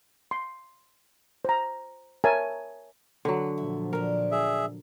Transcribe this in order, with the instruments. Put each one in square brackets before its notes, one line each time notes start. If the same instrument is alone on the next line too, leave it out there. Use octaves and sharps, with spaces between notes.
[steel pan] C6
C5 A#5
A#4 C#5 E5 G#5 A5
[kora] D3 F#3 [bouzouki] B4
[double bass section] A#2 F3 [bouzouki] E4
[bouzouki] C#4 D4 [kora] A#4
[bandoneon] G#4 E5